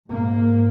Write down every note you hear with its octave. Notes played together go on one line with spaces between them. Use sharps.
G#2 A#3